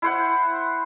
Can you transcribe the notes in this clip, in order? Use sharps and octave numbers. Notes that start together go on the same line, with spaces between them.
E4 C5 F#5